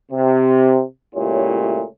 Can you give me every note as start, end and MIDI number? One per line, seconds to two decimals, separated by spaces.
0.12 0.82 48
1.15 1.85 37
1.15 1.85 46
1.15 1.85 57
1.15 1.85 64
1.15 1.85 67
1.15 1.85 73